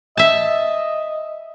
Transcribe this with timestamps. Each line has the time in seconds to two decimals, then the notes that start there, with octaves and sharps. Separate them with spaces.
0.17 D#5 E5 A5